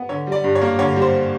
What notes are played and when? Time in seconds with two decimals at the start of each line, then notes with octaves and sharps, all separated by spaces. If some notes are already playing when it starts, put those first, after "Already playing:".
Already playing: B3
0.09 D3 C#5
0.27 G3
0.32 D5
0.44 G2
0.55 C#5
0.61 A#3
0.79 D3 C#5
0.96 G3
1.02 C5